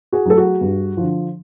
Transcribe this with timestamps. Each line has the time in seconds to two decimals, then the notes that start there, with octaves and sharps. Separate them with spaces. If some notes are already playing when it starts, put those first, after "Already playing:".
0.13 F#4 G#4
0.25 F#3 A3 A4
0.37 F#4 G#4
0.61 G2
0.97 D3 F3